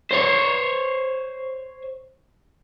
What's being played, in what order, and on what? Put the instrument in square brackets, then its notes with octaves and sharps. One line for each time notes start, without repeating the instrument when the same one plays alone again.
[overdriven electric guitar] C5 C#5